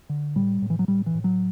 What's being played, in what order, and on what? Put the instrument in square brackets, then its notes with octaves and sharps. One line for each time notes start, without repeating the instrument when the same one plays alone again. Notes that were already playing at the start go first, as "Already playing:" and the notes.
[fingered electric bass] D3
A2 G3
A2
E3
F#3
A2 G3
E3
A2
F#3